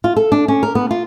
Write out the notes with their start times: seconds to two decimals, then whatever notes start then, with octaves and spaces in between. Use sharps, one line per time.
0.04 F4
0.16 A4
0.32 D4
0.48 C#4
0.63 A#4
0.75 B3
0.91 F4